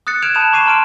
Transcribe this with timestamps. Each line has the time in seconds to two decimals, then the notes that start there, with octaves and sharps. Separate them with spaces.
0.07 D#6 F#6 A6 C#7
0.22 F6 F#6 G#6 D7 E7 F7
0.34 A5 B5 D#6 G6 E7 F7
0.52 B5 C#6 D6 C7 D#7 E7
0.66 A5 A#5 C6 F6 D7 D#7